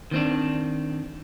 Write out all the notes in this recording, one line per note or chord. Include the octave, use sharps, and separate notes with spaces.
D#3 C4 D4